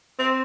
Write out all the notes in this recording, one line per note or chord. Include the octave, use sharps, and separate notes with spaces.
C4